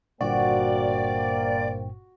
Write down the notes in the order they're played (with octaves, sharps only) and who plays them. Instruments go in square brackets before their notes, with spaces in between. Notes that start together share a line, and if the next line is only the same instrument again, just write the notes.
[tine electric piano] G1 G2 A#2 [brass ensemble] A#3 C5 G5 [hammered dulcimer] F#4 [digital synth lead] D5